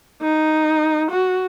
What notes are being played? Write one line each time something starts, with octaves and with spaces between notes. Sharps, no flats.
D#4
F#4